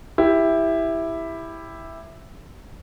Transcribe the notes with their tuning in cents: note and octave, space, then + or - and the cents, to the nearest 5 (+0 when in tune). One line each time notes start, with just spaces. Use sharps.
E4 +0 G4 +15